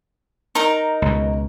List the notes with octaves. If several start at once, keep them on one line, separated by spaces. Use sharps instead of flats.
D#4 A#4 A#5
C#2 B2